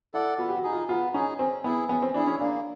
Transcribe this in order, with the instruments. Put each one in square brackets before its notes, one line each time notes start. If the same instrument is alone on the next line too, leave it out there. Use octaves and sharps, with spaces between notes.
[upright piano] E4 [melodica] A4 D5 F#5
[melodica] B3 [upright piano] F4
[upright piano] G4
F#4
[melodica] D#4 G#4
[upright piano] F4
[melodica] B3 [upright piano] F4
[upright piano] C#4 [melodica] D#4 G#4
[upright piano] C4 [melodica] C#4
[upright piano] B3 [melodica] E4 G#4
[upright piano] B3 [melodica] C#4
[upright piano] C4
[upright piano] D4 [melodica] E4 G#4
[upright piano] C#4
[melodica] A#3 [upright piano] D4